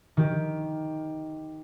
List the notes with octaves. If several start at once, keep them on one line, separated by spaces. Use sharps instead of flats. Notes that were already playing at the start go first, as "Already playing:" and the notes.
D#3 G4